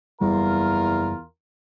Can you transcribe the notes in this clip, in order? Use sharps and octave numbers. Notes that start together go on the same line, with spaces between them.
F#1 E2 G3 F4 A#4